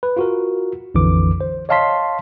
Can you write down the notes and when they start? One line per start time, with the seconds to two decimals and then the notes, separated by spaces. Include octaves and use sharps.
0.03 B4
0.17 F4 F#4 A#4
0.94 A#1 F2 D3 E3 D6
1.41 C5
1.69 C#5 D#5 F5 A5 C6 B6